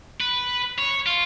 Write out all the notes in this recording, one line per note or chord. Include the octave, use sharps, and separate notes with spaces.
B4
C#5
F4